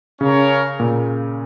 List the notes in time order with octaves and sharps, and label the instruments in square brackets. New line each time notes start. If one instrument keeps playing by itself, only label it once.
[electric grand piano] C#3 [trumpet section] C#4 A#4 C#5 F5
[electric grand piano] A#2